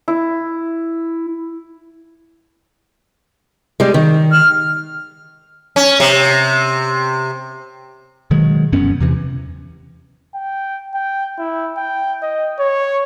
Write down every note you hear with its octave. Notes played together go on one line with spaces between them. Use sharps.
E4
G3 G#3
D#3
F6
C#4
C3
B2 D#3 F#3 G#3
F1 F#2 B3 C#4
E2 C3 E3
G5
G5
E4
G5
D#5
C#5